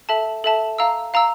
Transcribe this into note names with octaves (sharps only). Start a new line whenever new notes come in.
A4 E5 A5
A4 E5 A5
F5 A#5 E6
F5 A#5 E6